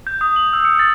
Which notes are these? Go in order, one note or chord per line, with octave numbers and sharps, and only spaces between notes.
G6
D#6
F#7
E6
C#7
A6